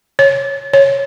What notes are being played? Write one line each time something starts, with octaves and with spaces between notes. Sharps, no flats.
C#5
C#5